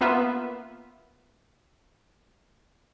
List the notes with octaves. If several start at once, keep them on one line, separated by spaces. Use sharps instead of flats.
A#3 B3 F4 B4 E5